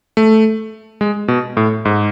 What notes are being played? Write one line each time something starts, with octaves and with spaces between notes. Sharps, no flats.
A3
G#3
B2
A2
G#2